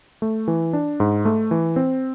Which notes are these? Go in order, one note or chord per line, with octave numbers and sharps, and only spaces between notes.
A3
E3
D4
G#2
A3
E3
C4